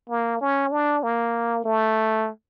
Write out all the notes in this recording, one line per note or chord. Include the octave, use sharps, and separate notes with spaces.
A#3
C#4
D4
A#3
A3